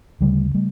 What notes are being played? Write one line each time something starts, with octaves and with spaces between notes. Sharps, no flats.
D2 C#3 G3 A3
G3 A3